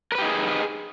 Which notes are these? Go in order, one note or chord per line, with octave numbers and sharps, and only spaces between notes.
D#4 G4 G#4 A#4 B4